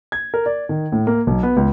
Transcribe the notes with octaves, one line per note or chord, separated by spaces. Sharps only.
G#6
A#4
D5
D#3
A2
A#3
B1
B3
C#2